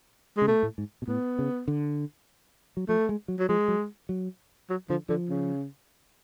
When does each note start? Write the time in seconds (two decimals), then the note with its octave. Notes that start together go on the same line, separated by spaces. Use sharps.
0.37 C#3 G#3
0.47 B2 A3
0.63 A2
0.78 G#2
1.02 B2
1.08 A2 B3
1.39 C#3
1.68 D3
2.77 F#3
2.89 F3 A3
3.09 G#3
3.28 F#3
3.39 F#3
3.49 F3 G#3
3.68 F#3
4.09 F#3
4.70 F#3
4.90 D3 F3
5.09 D3 F3
5.29 C#3